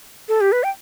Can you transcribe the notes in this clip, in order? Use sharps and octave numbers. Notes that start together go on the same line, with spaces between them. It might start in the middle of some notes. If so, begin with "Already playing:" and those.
A4
G4
B4
G5